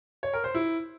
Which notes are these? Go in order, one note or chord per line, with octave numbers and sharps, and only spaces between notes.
C#5
A#4
C5
E4